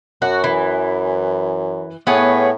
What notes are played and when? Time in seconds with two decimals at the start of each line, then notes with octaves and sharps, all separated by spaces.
0.22 F#2 F#4
0.44 E3
2.07 A2 B3 G#4 C#5